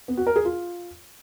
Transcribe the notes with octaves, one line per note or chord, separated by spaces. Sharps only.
B3
F#4
A#4
G#4
F4